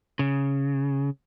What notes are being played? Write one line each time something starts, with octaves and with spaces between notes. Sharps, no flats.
C#3